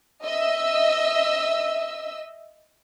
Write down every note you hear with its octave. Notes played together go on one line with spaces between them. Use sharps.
D#5 E5 E6